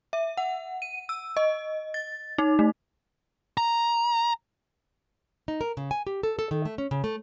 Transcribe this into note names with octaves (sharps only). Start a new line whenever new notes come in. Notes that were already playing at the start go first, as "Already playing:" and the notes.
E5
F#5
D#7
E6
D#5
A6
D#4
A3
A#5
D#4
A#4
C#3
G#5
G4
A4
A4
D#3
A3
C#4
C#3
A3